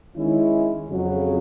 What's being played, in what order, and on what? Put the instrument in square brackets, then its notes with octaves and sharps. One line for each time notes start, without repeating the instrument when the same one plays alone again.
[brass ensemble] D#3 G#3 C#4 E4
F2 C#3 F#3